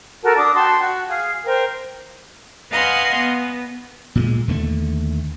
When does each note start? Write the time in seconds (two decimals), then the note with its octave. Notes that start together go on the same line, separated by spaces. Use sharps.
0.23 F#4 A4 A#4 A5
0.37 D4 D6 D#6
0.55 F#4 G5 A5 C6
0.81 F#4
1.08 G#4 F5
1.45 A#4 C5 G5
2.71 B4 D#5 F5 F#5 G#5 C6
3.16 B3
4.15 A#2 G3 G#3
4.48 D#2 D3 D#3 A3